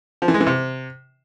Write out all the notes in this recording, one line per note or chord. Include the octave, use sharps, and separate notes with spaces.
F3
E3
G#3
E3
C3